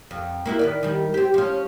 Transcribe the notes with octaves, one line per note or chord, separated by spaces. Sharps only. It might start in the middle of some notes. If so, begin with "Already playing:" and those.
F2
A#3 E4 F#4
D#3 B4 D5
D#3 G3
C4 G4
F3 C#4